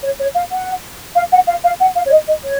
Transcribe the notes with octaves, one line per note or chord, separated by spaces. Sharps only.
C#5
C#5
F5
F#5
F5
F#5
F5
F5
F#5
F5
C#5
D#5
D#5
C#5